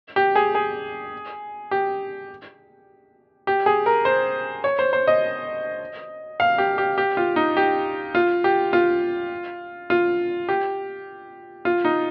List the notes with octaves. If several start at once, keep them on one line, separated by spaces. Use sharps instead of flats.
G4
G#4
G#4
G4
G4
G#4
A#4
C5
C#5
C5
C5
D#5
F5
G4
G4
G4
F4
D#4
G4
F4
G4
F4
F4
G4
F4
D#4